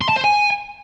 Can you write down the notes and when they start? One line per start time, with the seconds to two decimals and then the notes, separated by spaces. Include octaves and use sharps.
0.01 C6
0.09 A5
0.17 C5
0.24 G#5